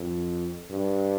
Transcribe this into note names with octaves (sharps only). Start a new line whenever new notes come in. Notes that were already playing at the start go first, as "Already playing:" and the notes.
Already playing: F2
G2